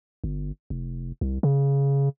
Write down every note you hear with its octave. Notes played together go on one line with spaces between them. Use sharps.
G1
F1
C2
C#3